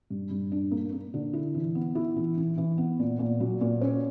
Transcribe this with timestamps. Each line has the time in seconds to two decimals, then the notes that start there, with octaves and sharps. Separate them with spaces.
0.10 G2
0.31 G2
0.52 D4
0.71 A#3
0.92 A#3
1.14 D3
1.33 E4
1.54 E3
1.75 B3
1.95 E4
2.16 E3
2.37 E3
2.58 E3
2.78 B3
3.00 A#2
3.19 A#2
3.40 F#3
3.61 A#2
3.81 C#4